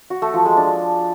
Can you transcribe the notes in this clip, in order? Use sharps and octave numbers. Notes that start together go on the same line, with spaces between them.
F#4
A3
F3
G#3
D4